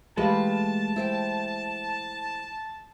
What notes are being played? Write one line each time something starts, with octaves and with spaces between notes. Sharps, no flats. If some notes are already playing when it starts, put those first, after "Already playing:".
E3 G#3 A3 G4 B4 F5 A5
E4 C5 G5